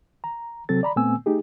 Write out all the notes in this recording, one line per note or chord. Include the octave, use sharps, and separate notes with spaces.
A#5
C3 F#3 C4 A4 A6
D5 A#5 B5
A#2 A3 B3 C4 G#5 E6
A3 D#4 G4 G#4